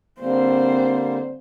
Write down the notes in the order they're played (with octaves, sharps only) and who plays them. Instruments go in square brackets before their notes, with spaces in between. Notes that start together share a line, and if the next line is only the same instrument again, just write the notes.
[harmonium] D3 G3 A#3 [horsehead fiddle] C4 C5